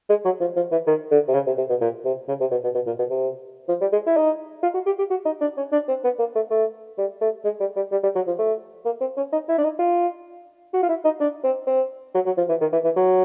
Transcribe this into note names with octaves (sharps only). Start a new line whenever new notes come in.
G#3
F#3
F3
F3
E3
D#3
D3
C3
C#3
C3
C3
B2
A#2
C3
C#3
C3
B2
B2
B2
A#2
B2
C3
F3
G3
G#3
E4
D#4
F4
F#4
G4
G4
F#4
D#4
D4
C#4
D4
C4
B3
A#3
A3
A3
G3
A3
G#3
G3
G3
G3
G3
F#3
F3
A3
A#3
C4
C#4
D#4
E4
D4
D#4
F4
F#4
F4
E4
D#4
D4
C4
C4
F#3
F#3
F3
E3
D#3
E3
E3
F#3